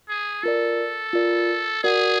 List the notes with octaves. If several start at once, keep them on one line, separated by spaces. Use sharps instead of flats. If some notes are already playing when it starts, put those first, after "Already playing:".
G#4
F4 A4 A#4 D5
F4 A#4 D5
F#4 G#4 A#4 D5 F#5